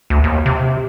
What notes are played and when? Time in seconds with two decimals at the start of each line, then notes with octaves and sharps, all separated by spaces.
0.10 D2
0.24 D#2
0.46 C3